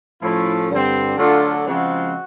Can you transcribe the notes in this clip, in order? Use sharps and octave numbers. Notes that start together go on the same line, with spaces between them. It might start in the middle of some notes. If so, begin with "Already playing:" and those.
A2 F3 A3 C#4 E4
G2 D3 G3 C4
D3 F#3 A3 D4 F4
C#3 F3 G#3 C4 F#4